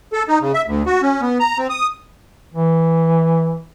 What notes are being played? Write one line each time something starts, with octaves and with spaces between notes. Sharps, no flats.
A4
D#4
C#3
E5
D2
F#4
C#4
B3
A#5
C4
D#6
E3